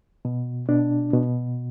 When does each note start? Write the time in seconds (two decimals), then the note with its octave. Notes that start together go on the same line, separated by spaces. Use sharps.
0.25 B2
0.69 B2 D4
1.13 B2